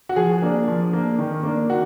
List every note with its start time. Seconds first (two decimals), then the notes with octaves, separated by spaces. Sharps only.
0.09 F#4
0.16 F3 G#4
0.42 A#3 D4
0.68 F3
0.93 A#3 D4
1.19 D#3
1.43 A#3 D4
1.69 D#3 F#4